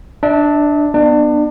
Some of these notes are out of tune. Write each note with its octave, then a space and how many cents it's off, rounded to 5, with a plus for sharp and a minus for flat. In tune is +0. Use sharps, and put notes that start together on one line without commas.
D4 +5 E5 -35
B3 -15 D4 +30